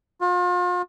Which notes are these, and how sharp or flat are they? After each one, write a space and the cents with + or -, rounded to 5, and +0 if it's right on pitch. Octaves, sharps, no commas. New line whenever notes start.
F4 +40